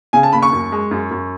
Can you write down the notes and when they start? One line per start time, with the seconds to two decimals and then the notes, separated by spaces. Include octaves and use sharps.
0.13 C#3 G#5
0.23 A5
0.33 D#2 B5
0.43 C#6
0.52 F#2
0.72 G#3
0.91 F#2
1.11 F#2